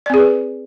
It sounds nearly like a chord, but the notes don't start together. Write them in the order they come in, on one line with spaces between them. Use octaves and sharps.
D5 C4 G#4 B4